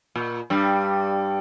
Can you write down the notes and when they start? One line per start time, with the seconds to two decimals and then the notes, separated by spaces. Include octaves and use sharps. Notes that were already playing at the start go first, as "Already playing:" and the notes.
0.16 A#2
0.50 G2 G3